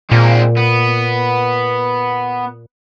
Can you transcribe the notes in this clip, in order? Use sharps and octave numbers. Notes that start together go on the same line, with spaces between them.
A#2 G#3 C4
B3